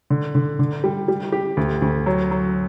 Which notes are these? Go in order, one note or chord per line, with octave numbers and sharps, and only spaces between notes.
D3
D3
D3
G3
G3
G4
D2
D2
F#3
F#3